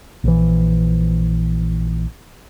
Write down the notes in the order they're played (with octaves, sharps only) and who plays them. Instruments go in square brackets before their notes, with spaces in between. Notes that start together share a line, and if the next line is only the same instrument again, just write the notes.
[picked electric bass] A#1 E3